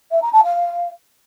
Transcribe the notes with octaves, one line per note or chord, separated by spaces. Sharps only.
E5
A#5
A5
F5